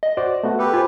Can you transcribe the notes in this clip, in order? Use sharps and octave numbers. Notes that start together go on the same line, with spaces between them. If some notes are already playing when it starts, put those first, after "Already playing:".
D#5
F#4 C5 D5
A3 B3 F#4
G4 A4 B4
F4 C5 G#5